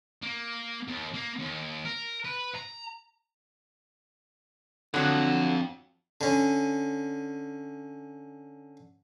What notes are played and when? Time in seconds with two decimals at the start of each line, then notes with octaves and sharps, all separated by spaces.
0.22 A#3
0.88 D#2
1.14 A#3
1.39 D#2
1.85 A#4
2.25 B4
2.55 A#5
4.94 F2 D3 F#3
6.21 D3 C#4